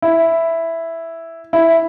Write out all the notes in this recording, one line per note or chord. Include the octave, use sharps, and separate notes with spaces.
E4
E4